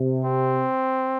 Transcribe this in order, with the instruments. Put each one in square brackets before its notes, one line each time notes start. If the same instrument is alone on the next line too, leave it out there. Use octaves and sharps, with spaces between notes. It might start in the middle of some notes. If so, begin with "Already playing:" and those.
Already playing: [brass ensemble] C3
[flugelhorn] C4